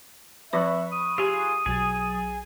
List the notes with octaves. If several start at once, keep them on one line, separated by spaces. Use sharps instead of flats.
F3 C4 B4 E5 B5 C#6 F#6
D#6
F4 G4 G#4
B1 F#3 G#4 A6